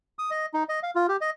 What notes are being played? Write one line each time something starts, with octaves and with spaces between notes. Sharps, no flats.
D#6
D#5
D#4
D#5
F5
F4
G4
D#5